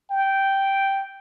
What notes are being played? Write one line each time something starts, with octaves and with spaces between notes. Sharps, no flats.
G5